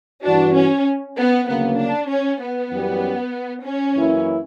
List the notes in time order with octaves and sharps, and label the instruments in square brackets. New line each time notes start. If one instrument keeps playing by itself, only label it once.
[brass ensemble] G2 E3 B3 F#4 [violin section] D4
[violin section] C#4
B3
[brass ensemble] D2 C#3 F#3 A#3 [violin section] B3
[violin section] D4
C#4
B3
[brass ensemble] F#2 E3 G3 C#4 G4
[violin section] C#4
[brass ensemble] F#2 E3 A#3 E4